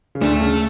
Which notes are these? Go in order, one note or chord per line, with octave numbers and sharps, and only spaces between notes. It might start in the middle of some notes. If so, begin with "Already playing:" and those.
C#3
D2 D3 A3
C#3